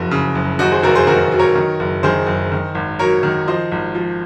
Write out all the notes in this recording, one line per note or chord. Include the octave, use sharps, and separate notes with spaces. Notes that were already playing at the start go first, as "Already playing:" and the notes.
Already playing: F#1 F2 F#4 A#4
C#3
F#1
D#2 D#4 F#4
G#4 C5
F1 F#4 A#4
G#4 C5
D#3 F#4 A#4
F#3
A#4 C#5
D#3
F#1
D#3 G#4 C5
F#1
D#3
G#1
F#3 A#4 C#5
D#3
F3 C5 D#5
G#1
F3